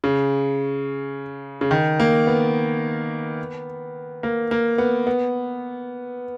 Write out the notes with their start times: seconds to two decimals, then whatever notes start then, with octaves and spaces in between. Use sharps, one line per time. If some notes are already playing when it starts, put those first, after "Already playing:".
0.04 C#3
1.61 C#3
1.71 D#3
2.00 A#3
2.27 B3
4.23 A#3
4.51 A#3
4.78 B3
5.07 B3